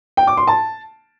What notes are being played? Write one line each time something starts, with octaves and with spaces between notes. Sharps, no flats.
G5
D6
C6
A5